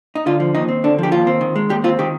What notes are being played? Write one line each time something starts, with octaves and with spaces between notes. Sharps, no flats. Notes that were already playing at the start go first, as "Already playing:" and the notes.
D#4
D3 F4
F3
D#2 D#4
C4
D3 D4
F3 G4
D#2 F4
C4
D#3
G#3
D#2 G4
C4 F4
D#3 G4